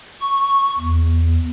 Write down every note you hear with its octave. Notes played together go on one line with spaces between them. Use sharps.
C#6
E2